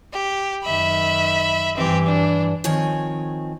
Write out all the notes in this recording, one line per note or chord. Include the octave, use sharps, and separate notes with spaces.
G4
F#2 D#3 E5 B5
G2 E3 C4 G4
D4
D#3 F3 C4 C#5 G#5